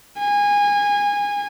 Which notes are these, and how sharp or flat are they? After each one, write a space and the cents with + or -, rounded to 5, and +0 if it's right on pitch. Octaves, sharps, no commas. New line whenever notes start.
G#5 -25